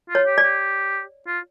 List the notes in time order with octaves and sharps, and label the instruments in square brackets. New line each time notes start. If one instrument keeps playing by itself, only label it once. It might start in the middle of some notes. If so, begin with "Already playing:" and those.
[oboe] F4
[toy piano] C#5
[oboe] G4
[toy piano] D5
[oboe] G4
F4